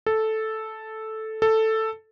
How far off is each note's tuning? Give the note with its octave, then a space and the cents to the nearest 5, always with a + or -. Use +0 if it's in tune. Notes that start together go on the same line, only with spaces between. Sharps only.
A4 -5
A4 +5